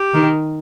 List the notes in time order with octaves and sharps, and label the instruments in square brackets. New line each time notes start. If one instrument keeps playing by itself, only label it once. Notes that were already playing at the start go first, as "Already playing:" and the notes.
Already playing: [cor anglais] G4
[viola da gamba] D#3